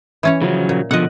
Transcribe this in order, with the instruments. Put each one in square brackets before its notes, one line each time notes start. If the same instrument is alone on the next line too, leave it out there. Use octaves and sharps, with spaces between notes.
[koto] E3 C#4 C#5
[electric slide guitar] C#3 F3 F#3
[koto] A#2
[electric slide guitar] B2 D3 F3 [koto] D#5 F#5